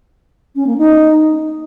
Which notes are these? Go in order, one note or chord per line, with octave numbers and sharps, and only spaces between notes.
C#4
A#3
D#4